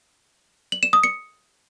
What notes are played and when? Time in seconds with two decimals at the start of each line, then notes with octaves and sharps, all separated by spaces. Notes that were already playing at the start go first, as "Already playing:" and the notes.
0.72 F#7
0.83 E7
0.93 D#6
1.03 C#7